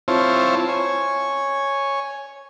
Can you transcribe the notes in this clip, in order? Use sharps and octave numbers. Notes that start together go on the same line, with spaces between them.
C4 E4 F4 C5 C#5 A5
C#5 G#5